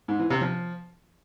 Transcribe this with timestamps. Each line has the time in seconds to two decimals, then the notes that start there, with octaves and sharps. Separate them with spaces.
0.08 G#2
0.19 E3
0.30 C3
0.41 F3